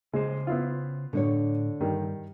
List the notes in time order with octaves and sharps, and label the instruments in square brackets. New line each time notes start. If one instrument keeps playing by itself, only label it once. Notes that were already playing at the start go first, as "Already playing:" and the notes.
[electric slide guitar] C#3 C5 [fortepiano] G#3
[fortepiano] B3 E4 F4
[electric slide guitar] A2 [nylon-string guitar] D3 D4 C#5
[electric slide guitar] G2 [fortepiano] D#3 G3